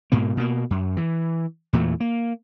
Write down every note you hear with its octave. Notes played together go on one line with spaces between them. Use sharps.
G#2 B2 A#3
B2 A#3
F#2
E3
E2 A#2 E3 A3
A#3